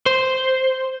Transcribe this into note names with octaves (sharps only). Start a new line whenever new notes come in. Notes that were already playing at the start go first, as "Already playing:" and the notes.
C5